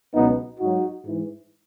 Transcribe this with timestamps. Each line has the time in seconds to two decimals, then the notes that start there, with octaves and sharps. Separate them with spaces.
0.14 C#2 B2 F#3 B3 D#4
0.59 G#2 F#3 D#4 F#4
1.04 G#2 E3